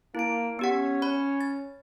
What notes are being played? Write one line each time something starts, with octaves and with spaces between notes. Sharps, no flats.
A#3 E4 D7
B3 C#4 G4 F#5
C#5 B5
A6